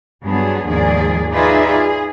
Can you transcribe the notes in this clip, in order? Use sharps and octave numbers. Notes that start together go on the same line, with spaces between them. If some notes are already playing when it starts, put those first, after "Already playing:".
G2 F#3 B3 D4 G#4
D#2 G#2 F3 G#4 D5
D#4 F4 G#4 B4 D5 E5
G#4